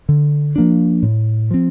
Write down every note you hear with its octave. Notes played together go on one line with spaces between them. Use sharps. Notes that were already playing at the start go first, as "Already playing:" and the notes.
D3
F3 A#3 D4
A2
F3 C4